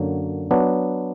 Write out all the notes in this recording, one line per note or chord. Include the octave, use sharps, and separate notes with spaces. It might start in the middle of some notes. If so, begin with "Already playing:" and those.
Already playing: F#2 D3 F#3 A#3
F#3 B3 D4